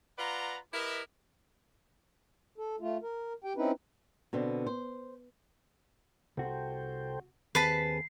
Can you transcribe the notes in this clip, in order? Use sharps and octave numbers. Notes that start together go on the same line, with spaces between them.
F4 B4 D5 F#5 A#5
E4 G4 A#4 B4 D#5 E5
A4
A3 F4
A#4
G4 G5
C4 C#4 D#4 E4 B4
B2 D3 C4
C5
C2 F#4 A4 C5 G5
D#2 C4 G#4 B4 A5 B5 C7